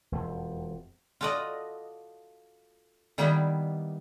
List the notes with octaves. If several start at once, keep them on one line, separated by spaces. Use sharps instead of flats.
E1 F2 F3
F4 F#4 A4 D5 D#5
D#3 G3 A#3 B3 D#4 E4